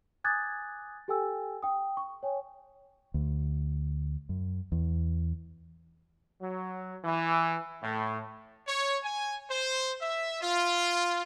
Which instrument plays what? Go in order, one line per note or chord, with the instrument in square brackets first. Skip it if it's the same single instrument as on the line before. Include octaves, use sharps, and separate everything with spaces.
[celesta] G#5 D6 D#6 F#6 G#6 A6
G4 A4 G5 G#5 E6
G5 D#6
C#6
C#5 G5 G#5
[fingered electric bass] D2
F#2
E2
[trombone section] F#3
E3
A2
[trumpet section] C#5
G#5
C5
E5
F4